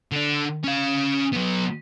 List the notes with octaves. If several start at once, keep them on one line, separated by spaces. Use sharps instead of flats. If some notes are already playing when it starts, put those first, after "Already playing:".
D3 D4
C#4 F5
F#3 B3